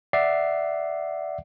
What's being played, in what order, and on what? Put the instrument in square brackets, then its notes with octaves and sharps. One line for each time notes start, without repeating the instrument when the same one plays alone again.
[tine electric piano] D5 E5 F#5 C7